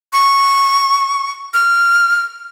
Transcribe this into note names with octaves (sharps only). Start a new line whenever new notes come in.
C#6
F6